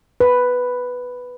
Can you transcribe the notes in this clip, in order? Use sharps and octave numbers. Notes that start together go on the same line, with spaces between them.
B4